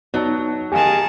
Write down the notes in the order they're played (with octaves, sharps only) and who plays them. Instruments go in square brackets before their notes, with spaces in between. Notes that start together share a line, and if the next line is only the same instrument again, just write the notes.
[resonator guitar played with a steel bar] F#3 [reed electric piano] B3 D#4 A5
[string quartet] D#3 G#4 A5 [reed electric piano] G4 F5 [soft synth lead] G#5